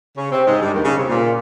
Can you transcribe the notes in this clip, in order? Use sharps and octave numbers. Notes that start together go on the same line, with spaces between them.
C#3 C#4
C3 C4
G#2 G#3
G2 G3
D#2 D#3
C#3
C3
A#2